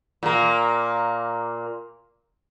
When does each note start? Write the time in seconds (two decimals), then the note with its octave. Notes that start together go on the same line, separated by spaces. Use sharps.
0.23 A#2 A#3